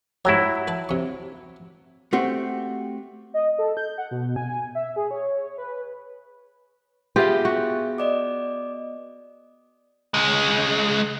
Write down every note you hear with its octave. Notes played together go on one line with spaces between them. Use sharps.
G#2 F#3 E4 G4 C#5
B4 A5
C3 C#6
A3 C4 F#4 G4
D#5
A4
G6
F#5
B2
G#5
E5
G#4
C#5
B4
B3 F4 G4 G#4 E5 F5
F#4
D5 D#5 D6
C#2 G#3